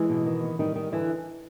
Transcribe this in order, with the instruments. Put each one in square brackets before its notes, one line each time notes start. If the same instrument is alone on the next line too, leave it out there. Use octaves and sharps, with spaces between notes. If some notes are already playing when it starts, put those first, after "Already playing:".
Already playing: [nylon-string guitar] E3 G#3 E4
B2
D#3
B3
D#3 G3 D#4
D#3
D3 E3 E4